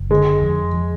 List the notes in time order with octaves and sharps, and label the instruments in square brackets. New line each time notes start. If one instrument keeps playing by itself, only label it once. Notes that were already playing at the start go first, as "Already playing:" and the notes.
Already playing: [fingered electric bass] F#1
[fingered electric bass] D3 [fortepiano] G#3
[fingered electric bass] F2
F3